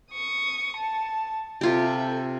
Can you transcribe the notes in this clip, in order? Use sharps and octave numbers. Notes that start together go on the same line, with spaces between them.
C#6 D#6
A5
C3 F4 G4 A4 E5